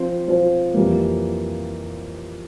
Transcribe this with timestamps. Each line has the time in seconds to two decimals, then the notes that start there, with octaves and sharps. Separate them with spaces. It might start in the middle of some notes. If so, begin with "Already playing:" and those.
Already playing: F3 C4 F4 C5
0.28 F3 C4 F4 C5
0.74 F2 E3 G3 A#3